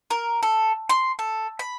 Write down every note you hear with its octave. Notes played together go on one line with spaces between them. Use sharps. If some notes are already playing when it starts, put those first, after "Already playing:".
A#4
A4
C6
A4
B5